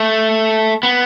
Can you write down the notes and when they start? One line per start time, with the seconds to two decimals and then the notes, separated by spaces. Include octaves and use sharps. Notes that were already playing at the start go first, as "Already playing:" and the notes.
Already playing: A3
0.83 B3